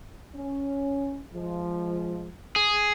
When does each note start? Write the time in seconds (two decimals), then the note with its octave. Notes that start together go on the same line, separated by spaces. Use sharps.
0.35 C#4
1.33 F3 G#3
2.56 G#4